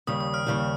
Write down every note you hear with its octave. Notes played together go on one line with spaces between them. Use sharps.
D#2 C#3 G3 D#6
D#6
F6
D#2 C#3 G3